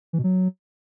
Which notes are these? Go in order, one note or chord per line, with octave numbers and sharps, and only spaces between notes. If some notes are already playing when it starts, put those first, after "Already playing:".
E3
B2
F#3